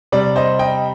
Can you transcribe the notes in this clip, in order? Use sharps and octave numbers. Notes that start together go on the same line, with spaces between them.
C3 G3 D5
C5 D#5
D#5 G5